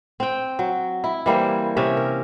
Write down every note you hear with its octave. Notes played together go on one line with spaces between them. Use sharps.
C4 G5
F#3
E4
E3 G3 A#3 C5
C3 C#4 E5
A#4